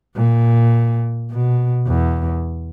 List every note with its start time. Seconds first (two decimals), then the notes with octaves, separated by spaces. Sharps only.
0.16 A#2
1.31 B2
1.87 E2